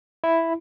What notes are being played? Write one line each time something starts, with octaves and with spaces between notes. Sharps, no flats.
E4